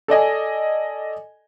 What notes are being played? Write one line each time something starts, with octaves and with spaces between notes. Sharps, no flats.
A4 D5 D#5 G#5